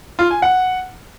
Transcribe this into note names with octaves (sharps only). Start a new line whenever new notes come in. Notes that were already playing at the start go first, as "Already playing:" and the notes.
F4
G#5
F#5